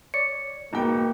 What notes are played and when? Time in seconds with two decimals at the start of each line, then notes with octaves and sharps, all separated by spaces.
0.14 C#5 D5 C#7
0.73 E1 A#3 D#4 G5